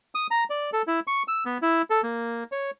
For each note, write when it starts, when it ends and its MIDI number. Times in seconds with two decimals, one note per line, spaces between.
0.15 0.27 87
0.31 0.44 82
0.50 0.70 74
0.73 0.82 69
0.87 1.00 64
1.07 1.23 85
1.28 1.44 88
1.45 1.58 59
1.62 1.82 64
1.90 2.01 69
2.03 2.44 58
2.52 2.71 73